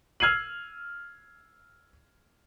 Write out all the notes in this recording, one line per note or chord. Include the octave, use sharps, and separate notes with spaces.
E6 F6 G#6 C7 D#7 F#7